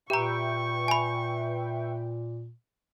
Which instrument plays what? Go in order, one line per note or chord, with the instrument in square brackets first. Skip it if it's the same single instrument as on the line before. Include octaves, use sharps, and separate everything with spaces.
[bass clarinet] A#2 [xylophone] G4 A#5 [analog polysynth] B4 E5 G5 [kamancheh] C#6
[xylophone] G#5 B5